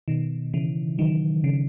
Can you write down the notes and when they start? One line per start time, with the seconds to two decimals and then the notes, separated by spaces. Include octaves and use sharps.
0.08 B2 D#3
0.54 C#3 E3
0.98 D#3 F#3
1.44 C#3